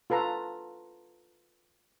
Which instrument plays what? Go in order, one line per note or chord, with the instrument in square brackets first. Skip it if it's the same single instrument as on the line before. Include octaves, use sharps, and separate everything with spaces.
[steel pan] F4 A4 B4 A#5